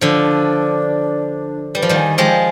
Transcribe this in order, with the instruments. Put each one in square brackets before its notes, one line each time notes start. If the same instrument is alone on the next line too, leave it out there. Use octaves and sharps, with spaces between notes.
[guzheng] D3 F3 [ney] D4
[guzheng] G3 [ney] B4
[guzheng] F3
D#3 G3
[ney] G#5
[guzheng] F3 G#3 [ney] G5